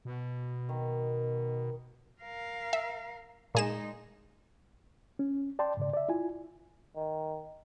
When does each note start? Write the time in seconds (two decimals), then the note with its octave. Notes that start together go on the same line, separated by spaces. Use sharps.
0.05 B2
0.69 D#3
2.22 A#4 F5
2.73 E5
3.55 A#2 G#3 D#4 G#4 E7
5.19 C#4
5.59 D5 G5 A5 C6
5.77 G#2 C#3 D5
5.93 D5 E5
6.09 E4 F4 G#5
6.96 D#3